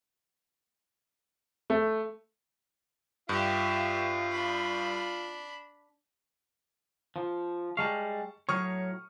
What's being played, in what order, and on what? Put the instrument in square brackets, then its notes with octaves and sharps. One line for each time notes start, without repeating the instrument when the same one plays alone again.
[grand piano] A3
[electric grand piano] G2 [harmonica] F4 [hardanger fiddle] G4 E5
[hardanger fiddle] D4 B5
[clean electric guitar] F3
[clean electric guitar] G3 G#3 F5 [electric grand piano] A5 C#6
[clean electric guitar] A2 F#3 C#5 [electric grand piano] C#6 D#6 F6